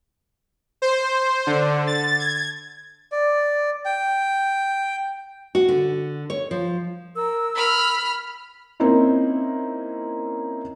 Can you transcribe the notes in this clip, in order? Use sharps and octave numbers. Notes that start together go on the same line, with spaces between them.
C5
D3
A6
G#6
D5
G5
F#4
D3
C#5
F3
A#4 E6
B5 F6
A#3 C4 C#4 D#4 E4